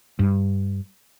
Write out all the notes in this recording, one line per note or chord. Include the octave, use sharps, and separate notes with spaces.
G2